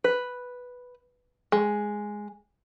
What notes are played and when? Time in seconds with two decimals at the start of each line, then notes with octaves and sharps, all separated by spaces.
0.04 B4
1.52 G#3